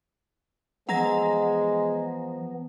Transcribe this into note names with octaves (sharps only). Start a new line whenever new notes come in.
E3 F3 G#3 B3 F#5 A#5 A#6